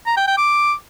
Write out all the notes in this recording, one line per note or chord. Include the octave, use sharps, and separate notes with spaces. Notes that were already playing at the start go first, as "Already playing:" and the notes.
A#5
G5
G5
D6